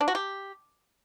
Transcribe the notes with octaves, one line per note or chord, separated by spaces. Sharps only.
D4
F#4
G4